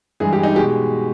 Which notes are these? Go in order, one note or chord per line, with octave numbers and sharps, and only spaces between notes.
G2 E3 G#3 G#4
G4
D#4
B2 G#3 G4